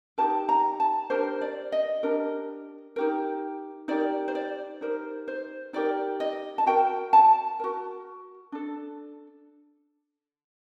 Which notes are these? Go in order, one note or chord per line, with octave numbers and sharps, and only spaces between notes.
D#4 G4 A#4 A5
A#5
A5
D4 G4 A#4 C5
D5
D#5
D4 G4 A#4
D#4 G4 A#4
D#4 G4 A#4 D5
C5
D5
D#4 G4 A#4 C5
C5
D#4 G4 A#4 D5
D#5
A5
F#4 A#4 G5
A5
F#4 A#4
D4 A4